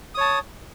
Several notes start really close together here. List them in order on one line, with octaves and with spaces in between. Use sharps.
D#6 C#5 A5